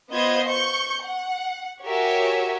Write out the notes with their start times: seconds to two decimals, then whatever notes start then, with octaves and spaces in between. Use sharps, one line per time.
0.12 B3 F4 C5 D#5 G6 G#6
0.46 C#6 G6 C#7
1.02 F#5
1.84 F#4 G4 A#4 C#5 E5 G#5